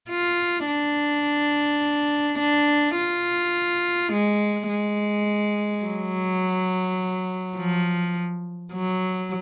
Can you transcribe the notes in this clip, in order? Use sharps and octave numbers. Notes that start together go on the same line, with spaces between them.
F4
D4
D4
F4
G#3
G#3
F#3
F3
F#3